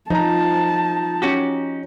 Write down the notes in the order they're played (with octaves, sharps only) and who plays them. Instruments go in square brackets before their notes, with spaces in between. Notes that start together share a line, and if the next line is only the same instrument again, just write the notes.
[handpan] F3 [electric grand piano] D#4 A#5 [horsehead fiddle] A5
[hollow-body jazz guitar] C#4 F#4 G4